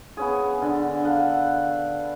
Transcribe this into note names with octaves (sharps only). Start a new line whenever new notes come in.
B3 C#4 G#4
D3
A4 F5 F#5